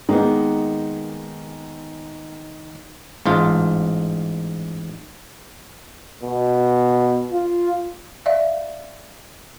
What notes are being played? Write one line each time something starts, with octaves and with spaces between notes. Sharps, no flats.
D#3 G#3 A#3 B3 D#4
A1 G#2 F4
B2
F4
D5 E5 F5